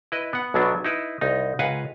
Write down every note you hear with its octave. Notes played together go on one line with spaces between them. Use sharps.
E4 B4 D#5
B3 F#5
B1 B2 F#3 B3 D4
D#4 E4 B4
C2 D#4
C#2 B4 F5 F#5 G#5 A#5